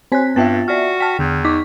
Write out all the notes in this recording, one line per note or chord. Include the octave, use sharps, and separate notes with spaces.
C4 C5 C#5 G#5 F#6 B6
G2 B3 F4 E5 G5 A5 A6
F#4 D5 F6
G5 A5 F6 B6
E2 D3
D#4 C#6 D6 B6